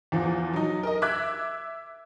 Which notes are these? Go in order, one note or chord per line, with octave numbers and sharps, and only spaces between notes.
E2 F3
F#3 D#4
A#4 D#5
E5 D6 F#6 G#6